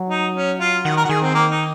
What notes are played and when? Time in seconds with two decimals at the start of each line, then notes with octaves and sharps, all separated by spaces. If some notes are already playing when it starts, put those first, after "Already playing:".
Already playing: F#3
0.10 D#4
0.35 C#4
0.60 F4
0.84 D#3 F#4
0.97 A#4
1.05 F#4
1.09 D#3 G#4
1.22 C4
1.34 A#3
1.51 D#4